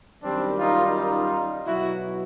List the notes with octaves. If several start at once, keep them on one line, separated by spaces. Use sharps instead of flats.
F#2 D#3 G3 C4 D4
D#4 F4
D#4 F4
B2 F#3 E4 F#4